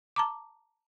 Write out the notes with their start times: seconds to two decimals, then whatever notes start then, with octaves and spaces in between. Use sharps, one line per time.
0.16 A5 A#5 D6